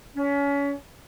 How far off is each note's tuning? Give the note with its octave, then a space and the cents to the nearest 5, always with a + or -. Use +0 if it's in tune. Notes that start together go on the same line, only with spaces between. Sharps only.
C#4 +30